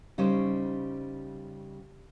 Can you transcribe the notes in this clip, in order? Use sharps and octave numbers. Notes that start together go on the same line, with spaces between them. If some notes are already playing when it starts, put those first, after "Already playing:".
C#3 G3 C#4 D#4 C5